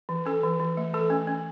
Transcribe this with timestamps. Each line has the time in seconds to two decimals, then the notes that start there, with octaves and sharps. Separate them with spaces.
0.09 E3
0.26 C#4 A4
0.43 E3
0.60 E3
0.77 A3
0.93 E3 A4
1.10 C#4
1.27 C#4